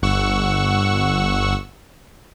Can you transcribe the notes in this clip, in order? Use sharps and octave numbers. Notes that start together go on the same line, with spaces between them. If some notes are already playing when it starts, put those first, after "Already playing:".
G1 F#5 C#6 E6